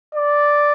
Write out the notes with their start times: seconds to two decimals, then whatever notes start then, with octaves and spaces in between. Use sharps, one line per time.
0.15 D5